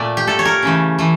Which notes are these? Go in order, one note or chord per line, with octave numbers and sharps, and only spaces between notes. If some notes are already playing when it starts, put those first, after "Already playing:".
Already playing: A#2 A3 D5
G4
A#2 A3 A4
C#5
A#4
C#3 E3 A3
E3 A3